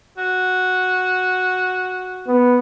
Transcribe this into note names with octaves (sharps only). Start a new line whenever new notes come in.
F#4
B3